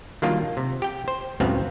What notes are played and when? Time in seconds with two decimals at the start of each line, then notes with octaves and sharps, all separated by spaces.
0.22 D#3 F#3 G3 A#3 D4 F4
0.57 C3
0.82 G4 G5
1.08 C5
1.40 C#2 F#2 A2 B3 C4 F5